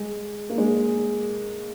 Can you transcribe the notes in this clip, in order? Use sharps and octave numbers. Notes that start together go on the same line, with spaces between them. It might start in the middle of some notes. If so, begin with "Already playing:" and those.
Already playing: G#3
A#3
G#3